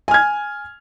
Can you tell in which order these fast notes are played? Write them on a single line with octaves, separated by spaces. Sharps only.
G#5 F6 G#6